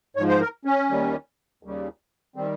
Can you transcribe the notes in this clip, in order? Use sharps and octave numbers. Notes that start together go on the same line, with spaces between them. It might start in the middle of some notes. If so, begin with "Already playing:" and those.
G#2 F3 C#5
C5
A#4
C#4
D#2 D#3 G3
D#2 C#3 G3
D#3 G3 C4